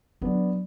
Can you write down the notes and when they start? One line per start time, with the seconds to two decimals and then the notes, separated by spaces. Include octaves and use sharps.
0.21 F#3 B3 D4